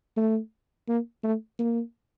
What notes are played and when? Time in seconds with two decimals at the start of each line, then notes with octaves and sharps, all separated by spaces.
0.17 A3
0.88 A#3
1.24 A3
1.59 A#3